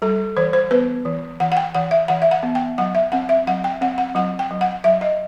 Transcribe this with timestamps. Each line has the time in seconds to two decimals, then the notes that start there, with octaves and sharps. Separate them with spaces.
0.02 G3 A4
0.37 E3 C5
0.53 C5
0.71 B3 B4
1.05 E3
1.40 E3 F#5
1.52 F#5
1.57 G5
1.75 E3 F#5
1.91 E5
2.08 E3 F#5
2.22 E5
2.31 F#5
2.43 B3
2.55 G5
2.78 F#3 F#5
2.95 E5
3.12 C4 F#5
3.29 E5
3.47 F#3 F#5
3.64 G5
3.81 C4 F#5
3.98 F#5
4.15 F#3 F#5
4.39 G5
4.51 F#3
4.61 F#5
4.84 F#3 E5
5.01 D#5